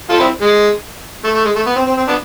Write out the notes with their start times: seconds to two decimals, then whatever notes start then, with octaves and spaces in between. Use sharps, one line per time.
0.09 F4 A4
0.20 C4 E4
0.41 G#3
1.24 A3
1.35 A3
1.45 G#3
1.56 A3
1.66 B3
1.76 C4
1.87 C4
1.97 C4
2.08 B3 D4